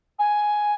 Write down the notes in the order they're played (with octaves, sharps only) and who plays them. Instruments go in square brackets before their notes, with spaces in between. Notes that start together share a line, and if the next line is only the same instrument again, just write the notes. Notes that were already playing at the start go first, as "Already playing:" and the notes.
[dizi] G#5